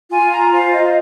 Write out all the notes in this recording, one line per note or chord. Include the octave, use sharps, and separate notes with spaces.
F4 G#5
A#5
C5 F5
D#5